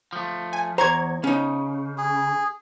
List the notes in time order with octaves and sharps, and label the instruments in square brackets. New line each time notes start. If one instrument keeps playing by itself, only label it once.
[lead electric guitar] F3 A3
[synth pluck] G#5
[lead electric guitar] E2 [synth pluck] C5 C#6 G#6 [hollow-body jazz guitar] A#5
[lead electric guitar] C#3 [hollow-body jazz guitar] C#4 D#4
[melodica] G#4